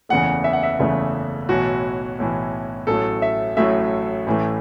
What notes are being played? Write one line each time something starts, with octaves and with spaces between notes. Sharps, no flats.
F#1 E2 C#3 E3 A3 F#5
E5
F#5
E5
F#1 E2 C#3 E3 A3
B1 A2 E3 F#4
B1 A2 E3
A1 A2 F#3 A3 A4
E5
A1 A2 F#3 A3 E5
A1 A2 E3 A3